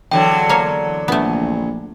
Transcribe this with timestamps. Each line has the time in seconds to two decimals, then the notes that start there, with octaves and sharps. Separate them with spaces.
0.11 E2 D3 F#3 G5
0.49 A#3 C#5 A#5
1.08 A#1 A3 B3